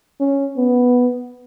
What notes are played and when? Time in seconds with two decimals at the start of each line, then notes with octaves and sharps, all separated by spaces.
0.20 C#4
0.57 B3